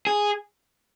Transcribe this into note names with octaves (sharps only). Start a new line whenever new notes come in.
G#4